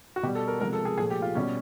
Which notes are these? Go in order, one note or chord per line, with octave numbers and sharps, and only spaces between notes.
F#4
B2 G3 G4
A4
A#4
C3 F3 G#3 A#4
A4
G#4
A#2 F3 A3 G#4
G4
F4
B2 G3 C#4